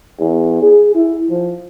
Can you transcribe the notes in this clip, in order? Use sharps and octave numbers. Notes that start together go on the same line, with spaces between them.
E2
G#4
E4
F3